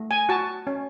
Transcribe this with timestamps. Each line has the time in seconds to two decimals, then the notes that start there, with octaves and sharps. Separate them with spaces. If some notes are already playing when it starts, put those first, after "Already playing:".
Already playing: A3
0.11 G#5
0.29 F#4 A5
0.67 C#4